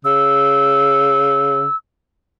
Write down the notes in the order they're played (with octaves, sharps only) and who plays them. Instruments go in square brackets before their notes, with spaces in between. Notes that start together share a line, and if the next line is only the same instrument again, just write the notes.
[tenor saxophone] C#3 [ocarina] E6